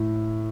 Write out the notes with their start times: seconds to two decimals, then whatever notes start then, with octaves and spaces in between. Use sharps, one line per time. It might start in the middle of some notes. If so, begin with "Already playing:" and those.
Already playing: A2